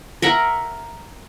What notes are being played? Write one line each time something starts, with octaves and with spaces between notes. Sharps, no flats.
A#4 E5 F#5 A#5